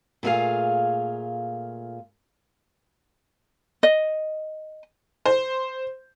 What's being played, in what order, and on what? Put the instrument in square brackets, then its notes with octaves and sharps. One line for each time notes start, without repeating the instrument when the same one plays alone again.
[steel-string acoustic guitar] A#2 A3 E4 F4 G#4 F5
[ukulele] D#5
[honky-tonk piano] C5